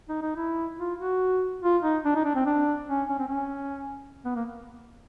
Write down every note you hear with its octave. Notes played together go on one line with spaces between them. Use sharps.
D#4
D#4
E4
F4
F#4
F4
D#4
D4
D#4
D4
C4
D4
C#4
C#4
C4
C#4
B3
A#3